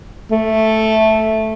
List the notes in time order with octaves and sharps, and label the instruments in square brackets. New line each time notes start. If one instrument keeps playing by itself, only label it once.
[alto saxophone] A3